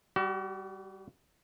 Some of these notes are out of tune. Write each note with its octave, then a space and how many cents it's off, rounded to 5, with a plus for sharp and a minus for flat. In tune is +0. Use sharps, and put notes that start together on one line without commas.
G3 +0 F#4 +40